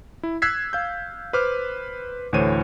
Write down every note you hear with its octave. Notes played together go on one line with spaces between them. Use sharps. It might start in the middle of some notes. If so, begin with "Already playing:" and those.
E4
E6 F#6 G#6 B6 C7
F5 G6
B4 C5 D6 F6
D2 A2 E3 C5 C#5 D#7